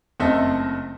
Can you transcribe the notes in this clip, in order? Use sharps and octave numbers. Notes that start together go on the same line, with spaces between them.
F#1 A3 C4 A4 D#5 E5